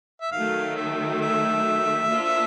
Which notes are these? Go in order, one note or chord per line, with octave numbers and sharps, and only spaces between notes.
E5
D#3 F#3 A3 F5
E5
E5
A#3 D4 F4 A4 C5